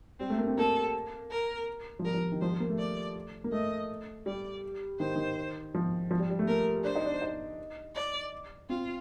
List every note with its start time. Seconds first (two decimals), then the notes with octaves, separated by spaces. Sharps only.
0.19 G3 C4
0.30 A3
0.38 A#3
0.47 C4
0.57 A#3 A4
1.31 A#4
1.99 F3
2.05 G3 A#4
2.14 F3
2.32 D#3
2.41 F3 C5
2.51 G3
2.60 A#3
2.70 A3
2.79 D5
3.44 A#3
3.52 A3 D#5
4.26 G3 D5
4.99 D#3 C5
5.16 D#3
5.74 F3
6.11 F3
6.19 G3
6.30 G3
6.39 A3
6.48 A#3 A#4
6.84 D4 C5
6.95 D#4
7.06 D4
7.22 D#4
7.95 D5
8.69 C4 F4